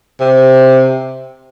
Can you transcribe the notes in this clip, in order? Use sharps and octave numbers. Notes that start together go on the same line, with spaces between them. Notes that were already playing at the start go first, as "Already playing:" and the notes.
C3